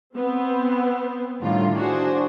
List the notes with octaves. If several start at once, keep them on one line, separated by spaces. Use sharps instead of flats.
B3 C4
A2 D3 D#3 G3 F4
D4 F#4 G#4 C5